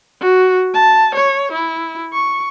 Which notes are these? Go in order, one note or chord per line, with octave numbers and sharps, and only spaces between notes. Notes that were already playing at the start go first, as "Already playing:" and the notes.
F#4
A5
C#5
E4
C#6